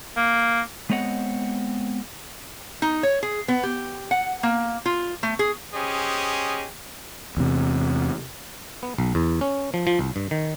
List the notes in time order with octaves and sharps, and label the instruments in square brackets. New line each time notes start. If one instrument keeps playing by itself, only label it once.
[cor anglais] A#3
[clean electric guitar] G#3 B3 C4 C#5 D#5 F#5
[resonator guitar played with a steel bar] D#4
C#5
G#4
B3
G4
F#5
A#3
F4
A3
G#4
[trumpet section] C#4 G4 G#4 C5 D#5
[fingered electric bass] E2 C3
[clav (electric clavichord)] B3
B1
E2
C#4
F3
F3
C2
G2
D#3